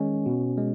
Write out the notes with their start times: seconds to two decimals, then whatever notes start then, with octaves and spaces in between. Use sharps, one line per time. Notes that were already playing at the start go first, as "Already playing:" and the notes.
Already playing: D#3 G#3 C#4
0.26 B2
0.57 G#3